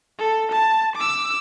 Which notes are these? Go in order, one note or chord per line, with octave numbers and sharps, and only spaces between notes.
A4
A5
D6 E6